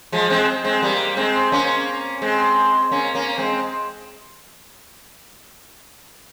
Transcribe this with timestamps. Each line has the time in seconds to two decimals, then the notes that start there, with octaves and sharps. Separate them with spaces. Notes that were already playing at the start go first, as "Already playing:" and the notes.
0.12 F3 G#3
0.30 G#3 C4
0.64 G#3 C4
0.82 G3 A#3
1.17 G#3 C4
1.52 A#3 C#4
2.22 G#3 C4
2.91 A#3 C#4
3.15 A#3 C#4
3.38 G#3 C4